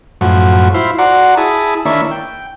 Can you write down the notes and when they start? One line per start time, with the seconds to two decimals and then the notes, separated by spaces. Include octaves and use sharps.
0.21 F#2 A2 F3 F#4
0.74 E4 F4 C5
0.99 F#4 D5 F#5 A#5 C6
1.37 E4 G#4 A5 D#6
1.85 D#3 A#3 D4 E4 C#5 E5
2.11 G5